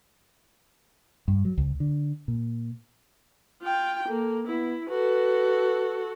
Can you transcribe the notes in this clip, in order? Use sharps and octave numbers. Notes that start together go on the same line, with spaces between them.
G2
F#3
C#2
D3
A#2
F4 G5
A#3 A4
B3 E4
F#4 A4 B4